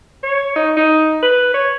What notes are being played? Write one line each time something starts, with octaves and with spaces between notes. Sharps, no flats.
C#5
D#4
D#4
B4
C#5